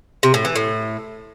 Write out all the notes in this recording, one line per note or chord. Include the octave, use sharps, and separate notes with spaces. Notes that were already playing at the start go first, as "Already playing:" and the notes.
C3
A2
E3
A2